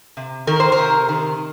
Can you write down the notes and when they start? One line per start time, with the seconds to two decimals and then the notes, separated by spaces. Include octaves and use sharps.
0.17 C3
0.47 D#3 A#4
0.60 C5
0.72 A#4
0.78 C3
1.09 D#3